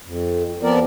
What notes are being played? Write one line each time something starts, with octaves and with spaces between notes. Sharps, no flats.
F2
F3 B3 C4 A#4 D5